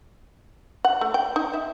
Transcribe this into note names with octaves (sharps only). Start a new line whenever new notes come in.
F#5
A3
G5
D#4
E5